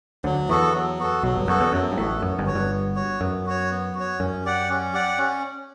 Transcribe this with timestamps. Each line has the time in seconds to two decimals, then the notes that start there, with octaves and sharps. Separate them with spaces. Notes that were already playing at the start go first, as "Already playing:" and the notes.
0.24 D2 D3 F#3
0.49 E2 E3 B3 F#4 A4
0.74 F#3
0.98 B3 F#4 A4
1.23 B1 B2 F#3
1.35 G1 G2
1.47 F#2 B3 F#4 A4
1.60 E2
1.73 F#2 F#3
1.92 G2
1.97 A1 A2 B3 F#4 A4
2.22 F#2 B3
2.38 G1 G2
2.46 F#4 C#5
2.55 G1 G2
2.72 B3
2.96 F#4 C#5
3.21 F#2 B3
3.46 F#4 C#5
3.70 B3
3.94 F#4
4.00 C#5
4.19 F#2 C#4
4.45 G4 D5 F#5
4.69 C#4
4.93 G4 D5 F#5
5.18 C#4